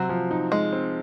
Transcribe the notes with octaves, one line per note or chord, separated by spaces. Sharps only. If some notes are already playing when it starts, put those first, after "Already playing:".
Already playing: C3 F#3 C4
F3
D#4
G#3 D#4
C4